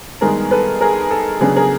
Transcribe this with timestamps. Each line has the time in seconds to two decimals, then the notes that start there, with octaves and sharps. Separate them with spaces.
0.21 G2 D#3 G#3 B3 G#4 A#4
0.51 A4 B4
0.81 G#4 A#4
1.11 A4
1.40 C#3 F#3 B3 D4 G#4
1.56 G#4 A#4